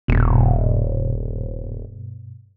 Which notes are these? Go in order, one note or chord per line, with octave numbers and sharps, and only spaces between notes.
D#1 G2 B2